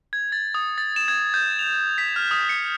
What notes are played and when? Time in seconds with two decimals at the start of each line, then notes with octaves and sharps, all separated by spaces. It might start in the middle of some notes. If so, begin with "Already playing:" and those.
0.13 G#6
0.32 A6
0.55 D#6
0.78 A6
0.96 E7
1.08 G#6
1.34 G6
1.59 F7
1.98 B6
2.16 F6
2.31 D#6
2.49 C#7